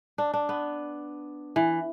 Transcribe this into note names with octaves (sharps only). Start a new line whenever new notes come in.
D4
D4
B3
E3